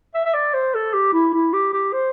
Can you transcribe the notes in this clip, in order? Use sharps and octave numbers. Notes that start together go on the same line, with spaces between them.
E5
E5
D5
C5
A4
G4
E4
E4
G4
G4
C5